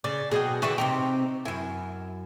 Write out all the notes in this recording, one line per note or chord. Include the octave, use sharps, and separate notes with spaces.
C#3 D5
B2 F#3 G#4 D#5 G5
D3 E3 G#4 D5 E5 C#6
C3 C4 D#4 G4
F#2 E4 G#5